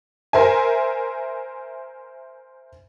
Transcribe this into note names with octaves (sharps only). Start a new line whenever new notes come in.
A#4 C5 E5 G#5